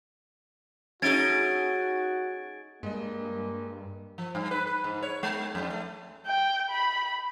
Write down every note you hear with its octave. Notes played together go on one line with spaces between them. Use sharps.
A3 C#4 D#4 F#4 G#4 G#6 A6 D7
G2 G#3 A#3 D#5
F3
G2
B4
B4
G#2
C#5
G#3
F2
A3
G5
B5